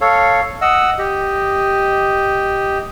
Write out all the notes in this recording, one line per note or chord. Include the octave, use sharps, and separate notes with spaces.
A4 C#5 F5
D#5 F#5 E6
G4 D#5